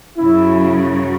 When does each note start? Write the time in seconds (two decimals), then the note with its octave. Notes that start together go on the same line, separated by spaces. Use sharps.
0.17 F#2 C#3 F#3 E4